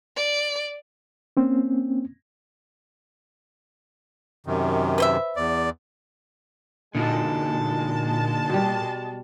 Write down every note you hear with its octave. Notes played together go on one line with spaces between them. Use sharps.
D5
A#3 C4 C#4
F#2 C3 D#3
B4 C5 E5
E2 D5
A#2 D3 G#3 D#4 F#4 A5
B2 G3